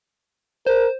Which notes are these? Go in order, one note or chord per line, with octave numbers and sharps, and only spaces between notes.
A#4 C5